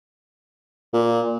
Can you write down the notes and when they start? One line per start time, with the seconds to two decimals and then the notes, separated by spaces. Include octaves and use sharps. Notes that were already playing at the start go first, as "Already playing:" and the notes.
0.94 A#2